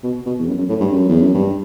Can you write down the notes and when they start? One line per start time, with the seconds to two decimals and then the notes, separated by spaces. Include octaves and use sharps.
0.04 B2
0.26 B2
0.39 E2
0.48 F#2
0.58 F#2
0.69 A2
0.80 G2
0.91 F#2
1.09 E2
1.21 F#2
1.34 G2